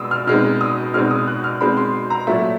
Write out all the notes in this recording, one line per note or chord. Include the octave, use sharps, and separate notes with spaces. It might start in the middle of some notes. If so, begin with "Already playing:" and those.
Already playing: B2 G#3 D#6 E6
F6
B2 G#3 C4 D#4 F6
D#6
B2 G#3 C4 D#4 F6
D#6
F#6
F6
B2 G#3 C4 D#4 B5
C6
A#5
A#2 F#3 A3 E5